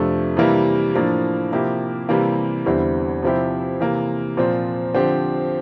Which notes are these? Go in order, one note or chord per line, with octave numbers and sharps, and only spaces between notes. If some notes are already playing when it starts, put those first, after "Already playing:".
Already playing: F2 C3 F3 A3 D4
C3 E3 G3 A#3 E4
A2 F3 A#3 D4
C3 F3 A#3 E4 G4
C3 E3 G3 A#3
E2 D3 G3 C4 E4
C3 F3 C4 E4 G4
C3 E3 A#3
A#2 F3 C4
D3 F3 C4 G4